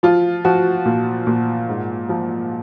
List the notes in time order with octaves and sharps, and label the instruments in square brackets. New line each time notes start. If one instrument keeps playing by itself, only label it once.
[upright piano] F3 F4
F3 F#4
A#2
A#2
G#2
F3